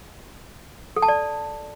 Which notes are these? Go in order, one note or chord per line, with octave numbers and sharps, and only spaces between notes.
A4
A5
D5